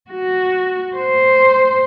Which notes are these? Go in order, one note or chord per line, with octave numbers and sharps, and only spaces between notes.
F#4
C5